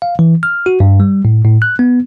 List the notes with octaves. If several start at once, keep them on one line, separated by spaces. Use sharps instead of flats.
F5
E3
F6
F#4
G2
G3
A2
A2
F#6
B3